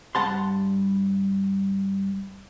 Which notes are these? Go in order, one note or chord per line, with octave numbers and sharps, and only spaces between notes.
G2 F#5 A5 C6